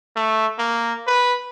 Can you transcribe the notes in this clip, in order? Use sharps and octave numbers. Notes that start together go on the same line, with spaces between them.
A3
A#3
B4